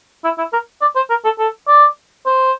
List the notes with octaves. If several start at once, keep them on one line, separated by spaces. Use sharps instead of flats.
E4
E4
A#4
D5
C5
A#4
A4
A4
D5
C5